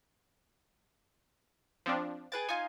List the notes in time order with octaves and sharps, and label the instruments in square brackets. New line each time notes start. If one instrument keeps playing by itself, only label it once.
[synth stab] F3 C4 D4
[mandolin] G#4 B4 G5 [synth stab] A6
[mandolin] D#4 F4 [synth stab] G#5